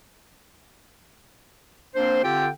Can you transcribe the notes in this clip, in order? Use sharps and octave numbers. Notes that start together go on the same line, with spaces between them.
A#3 C4 D4 C5
D3 C4 F4 G4 A4 G5